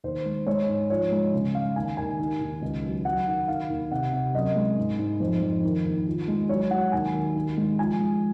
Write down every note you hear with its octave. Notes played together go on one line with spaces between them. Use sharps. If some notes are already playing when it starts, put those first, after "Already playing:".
D#2 C5
G#3
G#3 C#5
G#2
F3 C#5
G#3
C#3
G#3 F5
D#2 G#5
D#2 G#5
D#3
D#2
C#2
F#3
F#3 F#5
D#3
D#3 F5
D#2
C3 F#5
C3
F#2 D#5
G#3
G#2
G#2
F2 C5
F2
D#3
D#2
F3
G#3
F#3 C#5
F#3 F#5
D#2 G#5
D#2
D#3
G#3
F3 G#5
G#3